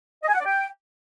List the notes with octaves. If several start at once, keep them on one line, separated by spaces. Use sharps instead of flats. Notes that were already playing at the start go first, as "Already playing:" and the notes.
D#5
G#5
F#5
D5
G5